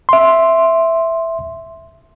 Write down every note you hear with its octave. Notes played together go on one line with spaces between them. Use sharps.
E5 C6